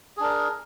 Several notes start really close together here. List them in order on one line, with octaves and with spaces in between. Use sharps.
G#4 D4 A#4